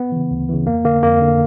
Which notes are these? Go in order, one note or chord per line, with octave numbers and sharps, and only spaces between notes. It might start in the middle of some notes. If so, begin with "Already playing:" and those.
Already playing: B3
C#3 E3
D2
C#3 E3
F2 A#3
D3 A#3
F2 A#3
D3